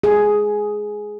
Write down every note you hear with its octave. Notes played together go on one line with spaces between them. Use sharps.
G#4